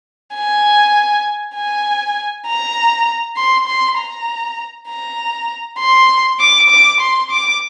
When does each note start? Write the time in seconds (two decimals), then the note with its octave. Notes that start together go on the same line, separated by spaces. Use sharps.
0.35 G#5
1.55 G#5
2.47 A#5
3.37 C6
3.68 C6
3.97 A#5
4.89 A#5
5.79 C6
6.40 D6
6.70 D6
7.00 C6
7.30 D6